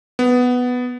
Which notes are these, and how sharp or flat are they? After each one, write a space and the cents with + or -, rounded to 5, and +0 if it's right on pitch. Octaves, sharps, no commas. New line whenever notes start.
B3 +5